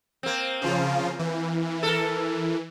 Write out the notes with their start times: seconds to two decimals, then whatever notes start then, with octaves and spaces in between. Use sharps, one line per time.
0.23 A#3 C4
0.62 C#3 F3 F4
1.19 E3
1.83 A4 A#4